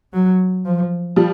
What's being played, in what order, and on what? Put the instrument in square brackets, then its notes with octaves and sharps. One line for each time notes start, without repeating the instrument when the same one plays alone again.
[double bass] F#3
F3
[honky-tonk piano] F3 G3